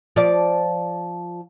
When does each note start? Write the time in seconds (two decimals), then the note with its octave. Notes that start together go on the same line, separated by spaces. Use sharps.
0.16 F3 D5